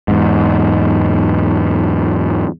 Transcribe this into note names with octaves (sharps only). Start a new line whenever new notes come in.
E2 G#2